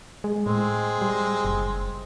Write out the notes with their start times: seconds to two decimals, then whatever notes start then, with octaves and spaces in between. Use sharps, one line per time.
0.24 G#3
0.46 A2 G#3 C4
1.02 G3
1.45 F#1